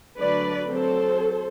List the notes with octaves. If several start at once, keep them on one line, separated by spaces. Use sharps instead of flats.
D3 F#3 A3 D4 B4 D5
F#3 C4 A4 C5